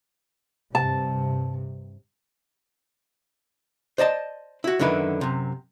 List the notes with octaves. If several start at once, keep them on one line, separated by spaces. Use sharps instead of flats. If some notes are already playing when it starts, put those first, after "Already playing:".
G2 C3 A5
C5 D5 D#5 A5
E4 F#4
F#2 D3 D#3 E4 B4
F#2 C3